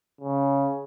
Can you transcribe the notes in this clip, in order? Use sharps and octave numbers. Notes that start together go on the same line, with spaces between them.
C#3